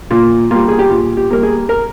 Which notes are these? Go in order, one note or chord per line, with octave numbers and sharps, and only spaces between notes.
A#2 F4
G3 A#3 F4
G#4
G4
A#2 F4
G4
G3 A#3 A#4
G#4
A#4